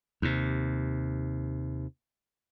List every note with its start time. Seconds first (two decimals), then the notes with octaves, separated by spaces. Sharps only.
0.22 D#2 C3